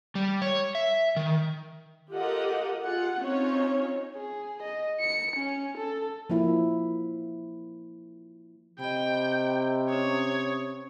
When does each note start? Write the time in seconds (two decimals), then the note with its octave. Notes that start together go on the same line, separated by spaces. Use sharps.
0.15 G3
0.42 C#5
0.75 E5
1.16 D#3
2.11 F4 G4 A4 A#4 D#5 F#5
2.82 F4 G#4 F#5
3.20 C4 C#4 D#4 F4 C#5
4.16 G#4
4.62 D#5
5.00 C#7
5.36 C#4
5.77 A4
6.30 F3 A#3 E4
8.80 C3 D#5 G5 B5
9.89 C#4 C#5 D#6